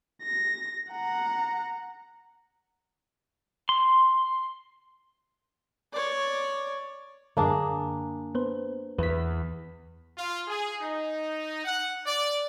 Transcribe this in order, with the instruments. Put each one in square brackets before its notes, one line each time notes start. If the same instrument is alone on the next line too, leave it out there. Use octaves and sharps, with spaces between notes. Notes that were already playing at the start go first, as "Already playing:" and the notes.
[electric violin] A#6
F#5 A#5
[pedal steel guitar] C6
[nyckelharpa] C#5 D5
[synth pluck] F#2 D3 [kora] A#3 D4 G#4
[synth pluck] B3 B4 C5
[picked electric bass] E2 [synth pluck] B4 B6
[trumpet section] F4
G#4
D#4
F#5
D5